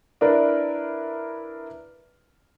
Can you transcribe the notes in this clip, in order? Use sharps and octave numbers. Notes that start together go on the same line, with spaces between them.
D4 E4 A#4 B4 D5